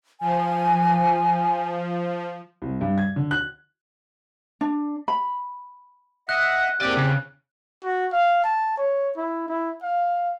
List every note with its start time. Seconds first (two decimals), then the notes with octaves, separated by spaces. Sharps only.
0.21 F3 G#5
2.62 C2
2.81 G2
2.98 G#6
3.16 D3
3.31 F#6
4.61 D4
5.08 B5
6.29 D#5 E5 F#5 F#6
6.81 E2 A#3 C4 G4 D5
6.97 C#3
7.84 F#4
8.13 F5
8.44 A5
8.78 C#5
9.17 E4
9.48 E4
9.83 F5